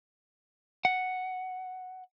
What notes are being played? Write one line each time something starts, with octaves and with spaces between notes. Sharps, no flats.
F#5